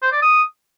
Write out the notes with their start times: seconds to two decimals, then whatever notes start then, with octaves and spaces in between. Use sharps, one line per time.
0.02 C5
0.12 D5
0.22 D#6